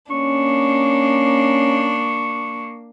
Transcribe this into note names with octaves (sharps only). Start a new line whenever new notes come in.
A#3 C#4 D4 C#6